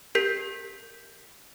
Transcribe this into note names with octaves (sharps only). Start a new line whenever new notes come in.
G4 A#4 G6 B6 C7